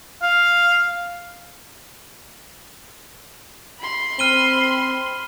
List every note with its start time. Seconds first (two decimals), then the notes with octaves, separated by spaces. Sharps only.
0.22 F5
3.79 B5 C6
4.19 C4 F6 D#7 G7